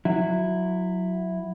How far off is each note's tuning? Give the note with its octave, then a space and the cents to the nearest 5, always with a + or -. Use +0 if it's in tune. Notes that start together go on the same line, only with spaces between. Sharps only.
F#3 -15 E4 +0